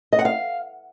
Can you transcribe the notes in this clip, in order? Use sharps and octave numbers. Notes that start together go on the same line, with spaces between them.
D#5
F#5
F5